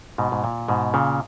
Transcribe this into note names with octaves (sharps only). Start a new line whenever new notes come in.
G#2 B2
G#2
A#2
G#2 B2
A#2 C#3